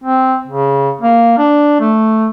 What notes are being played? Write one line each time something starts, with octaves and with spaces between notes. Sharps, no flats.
C4
C#3
A#3
D4
A3